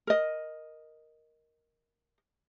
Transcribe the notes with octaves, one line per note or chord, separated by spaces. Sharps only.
A#4 D#5